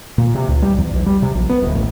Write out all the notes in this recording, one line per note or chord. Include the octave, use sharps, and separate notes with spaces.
A#2
C3
C#2
G3
E2
B1
G3
C3
A#1
B3
D1
A1